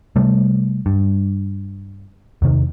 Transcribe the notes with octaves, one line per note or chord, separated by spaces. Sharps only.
C3 G3 A3
G2
E2 C3 D#3